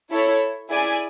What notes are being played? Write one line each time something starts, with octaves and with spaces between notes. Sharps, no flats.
E4 A4 C#5
E4 G#4 D5 G#5